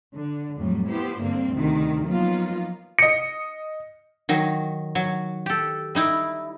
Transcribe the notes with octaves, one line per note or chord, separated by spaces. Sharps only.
D3
F2 A2 F#3 G3
B3 E4 G4 C5
G2 D3 A#3 C4
D2 C3 D#3
F3 F#3 A#3 B3 D#4 F4
D#5 C#7
D#3 F#3
F#3
G4 A4
G3 D#4 E4